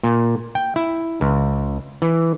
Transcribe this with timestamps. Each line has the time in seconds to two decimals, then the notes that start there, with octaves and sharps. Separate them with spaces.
0.03 A#2
0.55 G5
0.76 E4
1.21 C#2
2.02 E3